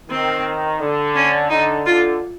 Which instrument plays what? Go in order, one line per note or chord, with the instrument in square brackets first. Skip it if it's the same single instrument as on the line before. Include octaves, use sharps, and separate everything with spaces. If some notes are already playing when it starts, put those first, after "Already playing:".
[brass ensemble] D#3 [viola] C4
[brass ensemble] D3
[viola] C#4
[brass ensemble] D3 [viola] D#4
[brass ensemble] D3 [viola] F4